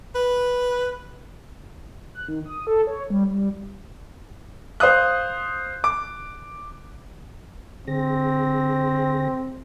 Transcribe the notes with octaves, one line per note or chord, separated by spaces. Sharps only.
B4
F#6
D#3
D#6
A4
C#5
G3
G3
C5 F5 D#6 F#6
D6
D3 C4 G#4 A#6